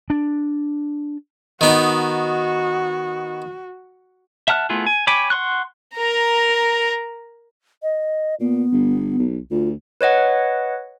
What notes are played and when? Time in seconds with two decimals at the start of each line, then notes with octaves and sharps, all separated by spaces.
0.10 D4
1.61 D#3 B3 D#4 F#4
4.48 E5 F#5 A5 F6 F#6
4.70 A3 B3 E4 F4 G#4
4.86 G#5
5.07 C#5 G5 G#5 B5 D6
5.30 F#5 C6 C#6 F#6
5.96 A#4 A#5
7.83 D#5
8.40 A#2 B3
8.72 G1
9.18 B1
9.51 D2 F4
10.01 B4 C#5 D#5 F#5